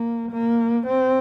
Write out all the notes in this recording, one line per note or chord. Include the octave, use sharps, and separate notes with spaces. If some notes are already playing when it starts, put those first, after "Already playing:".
Already playing: A#3
A#3
C4